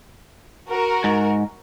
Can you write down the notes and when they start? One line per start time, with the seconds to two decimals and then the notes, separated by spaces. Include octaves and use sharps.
0.68 F#4 A#4
1.04 G#2